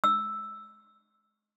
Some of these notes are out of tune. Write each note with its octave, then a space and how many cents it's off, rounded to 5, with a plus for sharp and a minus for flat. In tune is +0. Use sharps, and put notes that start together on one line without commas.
E6 +0